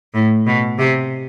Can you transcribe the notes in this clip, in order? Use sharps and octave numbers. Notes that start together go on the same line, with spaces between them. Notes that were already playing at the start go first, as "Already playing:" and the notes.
A2
B2
C3